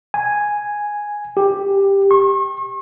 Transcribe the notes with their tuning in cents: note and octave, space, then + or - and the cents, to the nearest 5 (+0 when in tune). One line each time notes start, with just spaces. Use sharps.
G#5 +0
G4 +10
C#6 -40